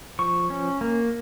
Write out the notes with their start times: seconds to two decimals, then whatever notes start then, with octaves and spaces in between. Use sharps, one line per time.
0.19 F3 C#6
0.50 C#4
0.81 A#3